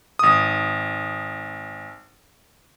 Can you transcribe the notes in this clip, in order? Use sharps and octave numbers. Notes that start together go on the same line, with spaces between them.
G#1 D#6